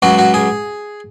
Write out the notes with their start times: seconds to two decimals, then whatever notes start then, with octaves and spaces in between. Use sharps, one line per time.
0.02 C#2 C#3 F#3 F#4
0.18 F#4
0.34 G#4